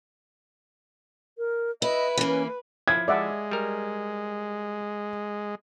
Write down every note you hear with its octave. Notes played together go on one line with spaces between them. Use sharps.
A#4
E4 B4 D#5
E3 A#3 C#4
F3 E4 G#6
G#3 D5 E5 F#5
G3 A#4